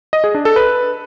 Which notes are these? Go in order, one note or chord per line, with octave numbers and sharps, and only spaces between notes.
D#5
G#4
D4
A4
B4